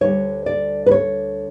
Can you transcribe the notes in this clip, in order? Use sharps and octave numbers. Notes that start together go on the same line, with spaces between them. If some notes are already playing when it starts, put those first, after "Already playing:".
D2 D3 G3 C#5
D5
B4
C#5